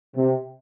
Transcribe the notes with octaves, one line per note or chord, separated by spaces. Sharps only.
C3